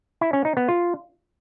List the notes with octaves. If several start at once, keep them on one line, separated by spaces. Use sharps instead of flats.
E4
C#4
D#4
B3
F4